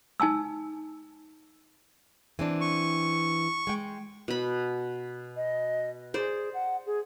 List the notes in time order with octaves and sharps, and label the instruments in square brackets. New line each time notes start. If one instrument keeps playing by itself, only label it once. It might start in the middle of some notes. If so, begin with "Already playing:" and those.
[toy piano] D#4 G#5 A5 E6
[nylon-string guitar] E3 C4 D4
[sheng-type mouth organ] C#6
[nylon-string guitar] G#3 G5
[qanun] B2 B5
[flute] D#5
[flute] G#4 [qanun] C5 D5
[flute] F#5
G#4